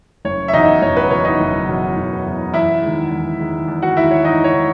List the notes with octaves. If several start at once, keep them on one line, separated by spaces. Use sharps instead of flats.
F#1 C#5
E5
E2 B2 D#4 D#5
F#1 C#5
B4
E2 B2 C#5
D#4 D#5
F#1
E2 B2
F#1
E2 B2
E2 E4 E5
D#3 G#3
E2
D#3 G#3
E2
F#4 F#5
D#3 G#3 E4 E5
C#5
E2 D#4 D#5
C#5
D#3